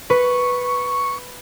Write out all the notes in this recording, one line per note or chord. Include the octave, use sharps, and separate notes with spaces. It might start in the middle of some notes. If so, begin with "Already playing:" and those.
B4 C#6